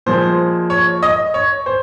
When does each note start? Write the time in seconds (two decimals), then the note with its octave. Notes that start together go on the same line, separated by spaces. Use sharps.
0.06 A#2 F3 G#3 C5
0.70 C#5
1.03 D#5
1.34 C#5
1.66 C5